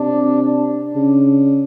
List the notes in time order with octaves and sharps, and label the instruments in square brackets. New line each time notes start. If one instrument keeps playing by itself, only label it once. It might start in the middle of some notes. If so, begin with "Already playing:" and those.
Already playing: [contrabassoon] C3 [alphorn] D4
[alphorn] D4
[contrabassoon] C#3